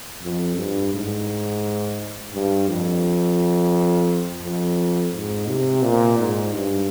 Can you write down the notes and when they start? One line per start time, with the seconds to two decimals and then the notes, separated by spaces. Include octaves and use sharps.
0.23 F2
0.58 G2
0.93 G#2
2.33 G2
2.68 F2
4.42 F2
5.13 G#2
5.48 C3
5.83 A#2
6.18 G#2
6.53 G2